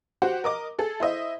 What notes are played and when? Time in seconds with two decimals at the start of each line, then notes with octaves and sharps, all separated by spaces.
0.22 F#4 G4 C5 F#5
0.44 A#4 D#5 D6
0.79 G#4 A4
1.00 E4 C5 D#5 E5